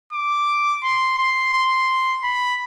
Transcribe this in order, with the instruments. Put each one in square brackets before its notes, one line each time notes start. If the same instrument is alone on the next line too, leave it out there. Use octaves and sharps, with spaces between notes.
[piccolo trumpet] D6
C6
C6
C6
B5